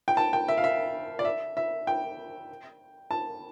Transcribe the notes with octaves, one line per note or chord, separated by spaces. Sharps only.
G5
A5
G5
E5
F5
E5
D5
E5
E5
G5
A5